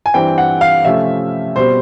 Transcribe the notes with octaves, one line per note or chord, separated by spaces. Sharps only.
G#5
G2 E3 G3 C4 G5
F#5
F5
C3 F3 A3 C#4 E5
B2 G3 C4 C5